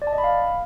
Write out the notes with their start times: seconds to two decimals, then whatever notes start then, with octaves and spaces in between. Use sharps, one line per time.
0.02 D5
0.07 A5
0.13 D#5
0.18 B5
0.24 F5